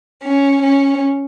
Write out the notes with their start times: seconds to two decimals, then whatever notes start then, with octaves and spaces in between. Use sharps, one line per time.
0.22 C#4
0.62 C#4